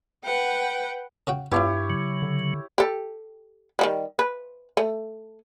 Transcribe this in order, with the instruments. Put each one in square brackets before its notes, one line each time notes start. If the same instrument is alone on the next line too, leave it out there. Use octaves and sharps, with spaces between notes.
[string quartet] B4 F#5 G5
[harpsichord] C#3 F#4 G5
[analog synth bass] G2 [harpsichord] B3 D4 F4 [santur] E4 G4 C#5
[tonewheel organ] C#3 F#3
[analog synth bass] D3
[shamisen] G4 A4
D#3 F#3 G3
B4
A3